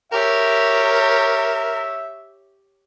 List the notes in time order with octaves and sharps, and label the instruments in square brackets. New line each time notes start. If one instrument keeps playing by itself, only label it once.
[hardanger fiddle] G4 C#5 [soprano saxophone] A#4 [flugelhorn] E5